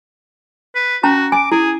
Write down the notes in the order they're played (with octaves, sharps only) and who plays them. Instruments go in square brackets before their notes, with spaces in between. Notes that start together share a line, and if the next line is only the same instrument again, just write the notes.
[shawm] B4
[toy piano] C#4 A5 A#5 [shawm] F#4
[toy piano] G#5 [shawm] D6
[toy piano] E4 [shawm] G#4